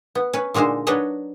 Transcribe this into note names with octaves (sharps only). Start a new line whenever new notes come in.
B3
C#4 B4
A#2 D3 G#3 D#4 C5
F#3 D4 D#4 B4 C#5 D#5